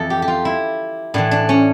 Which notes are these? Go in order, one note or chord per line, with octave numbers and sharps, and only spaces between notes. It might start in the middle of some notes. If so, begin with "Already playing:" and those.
Already playing: F2 E3 A4
G4
G4
F4
E4
A2 E3 D4
D4
C#4